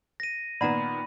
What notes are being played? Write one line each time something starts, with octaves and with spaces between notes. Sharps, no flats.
A#6 D#7
A#2 D#3 B3 D5 F#5 A#5 B5